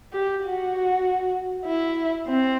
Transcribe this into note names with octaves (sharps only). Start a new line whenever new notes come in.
G4
F#4
E4
C4